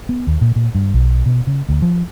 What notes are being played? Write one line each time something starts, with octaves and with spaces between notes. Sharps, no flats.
B3
D#2
A#2
A#2
G2
B1
B2
C#3
D2
F3